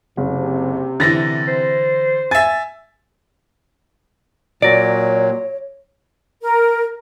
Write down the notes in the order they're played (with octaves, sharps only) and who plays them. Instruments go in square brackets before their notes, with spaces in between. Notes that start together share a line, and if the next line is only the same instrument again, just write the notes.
[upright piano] F#1 [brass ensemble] C3
[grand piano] D3 E3 [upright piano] A6 A#6
[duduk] C5
[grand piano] E5 G#5 [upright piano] A6
[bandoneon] A#2 F#3 [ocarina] C#5 [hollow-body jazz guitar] D5 [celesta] A#6 D7
[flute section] A#4